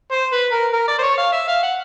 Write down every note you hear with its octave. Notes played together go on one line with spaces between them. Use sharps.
C5
B4
A#4
A#4
D5
C5
C#5
F5
E5
F5
F#5